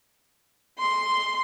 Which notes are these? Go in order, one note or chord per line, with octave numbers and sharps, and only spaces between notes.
C6